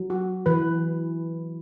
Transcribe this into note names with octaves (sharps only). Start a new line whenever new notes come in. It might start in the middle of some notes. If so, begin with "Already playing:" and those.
Already playing: F#3
F#4
E3 B4